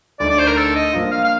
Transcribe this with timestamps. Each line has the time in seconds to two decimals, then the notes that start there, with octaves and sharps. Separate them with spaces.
0.20 D2 D3 A3 D#4 D5
0.30 D5
0.39 C5
0.48 A#4
0.57 A4
0.75 D#5
0.93 F3 A#3 D4 F4
1.11 F5
1.24 F5